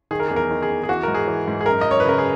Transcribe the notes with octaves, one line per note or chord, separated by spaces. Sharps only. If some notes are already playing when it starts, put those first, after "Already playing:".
D#3 G#4
A#4
E2 G#4
A#4
D#3
G#4
E2
G#4
E3 F#4
G#2 A#4
G#4
E3
G#2
G#4
F#2 A#4
F#2 D#5
C#5
B4
C#3 A#4
G#4